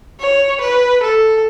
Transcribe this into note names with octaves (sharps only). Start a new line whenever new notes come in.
C#5
B4
A4